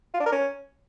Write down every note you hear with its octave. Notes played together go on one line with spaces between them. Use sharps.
F4
D4
A#4
C#4